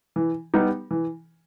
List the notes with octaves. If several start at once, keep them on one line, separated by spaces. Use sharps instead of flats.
E3
G3 B3 D#4
E3